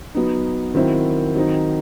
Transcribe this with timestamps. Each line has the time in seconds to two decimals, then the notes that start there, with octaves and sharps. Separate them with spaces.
0.15 F#3 B3 D#4
0.75 D#3 F#3 C4 E4
1.35 D#3 F#3 C4 D#4